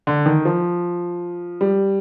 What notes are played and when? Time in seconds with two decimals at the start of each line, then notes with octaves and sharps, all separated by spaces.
0.07 D3
0.26 D#3
0.45 F3
1.61 G3